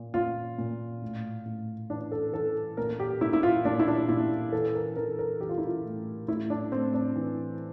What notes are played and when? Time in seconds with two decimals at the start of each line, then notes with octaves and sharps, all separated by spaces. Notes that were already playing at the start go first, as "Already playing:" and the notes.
Already playing: A#2
0.14 A#2 F4
0.58 A#2
1.02 A2
1.45 A2
1.90 E3 D4
2.12 A4
2.34 E3 A4
2.77 A#2 A#4
3.00 G4
3.21 A#2 E4
3.33 E4
3.43 F4
3.65 A#2 D4
3.79 E4
3.88 D4
4.09 A#2 E4
4.52 E3 A4
4.75 A#4
4.96 E3 A#4
5.19 A#4
5.40 E3 G4
5.49 F4
5.58 E4
5.66 F4
5.85 A2
6.28 A2 E4
6.50 D4
6.72 A2 C4
6.94 D4
7.16 E3